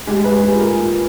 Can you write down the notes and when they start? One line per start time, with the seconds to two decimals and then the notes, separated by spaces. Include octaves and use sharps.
0.07 G#3 G4
0.24 B4
0.31 G#3
0.42 G#4
0.53 A#2
0.59 A#4
0.76 A#2